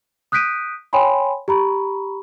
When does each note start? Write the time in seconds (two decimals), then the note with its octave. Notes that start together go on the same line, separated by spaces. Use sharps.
0.32 D#6 F#6 G6 B6 D7 D#7
0.93 C#5 G5 G#5 B5 C6
1.48 G4 A#5 B5 C#6